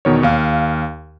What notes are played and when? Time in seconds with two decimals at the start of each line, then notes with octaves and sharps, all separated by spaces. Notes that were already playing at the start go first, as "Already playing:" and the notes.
0.05 E2 B2 D#3 C#5
0.23 D#2 F5